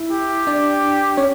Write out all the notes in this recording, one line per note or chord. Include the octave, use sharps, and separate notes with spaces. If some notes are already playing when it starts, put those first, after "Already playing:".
Already playing: E4 E5
G4
D4 D5
C#4 C#5